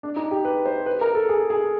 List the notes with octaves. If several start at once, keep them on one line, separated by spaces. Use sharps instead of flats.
D4
D#4
G4
B4
C5
B4
A#4
A4
G#4
G#4